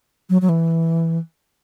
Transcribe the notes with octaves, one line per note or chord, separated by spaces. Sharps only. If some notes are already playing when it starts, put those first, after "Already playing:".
F#3
F#3
E3